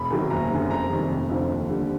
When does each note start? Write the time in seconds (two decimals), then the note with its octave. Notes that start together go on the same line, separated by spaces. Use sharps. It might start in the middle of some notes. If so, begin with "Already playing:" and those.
Already playing: E1 B5
0.10 E2 C3 D#3 F#3
0.30 F#1 A#5
0.50 F#2 D3 G3
0.70 F2 A#5
0.89 C3 D#3 G3
1.10 F1
1.30 F2 D3 F3
1.49 D#2
1.69 D3 G3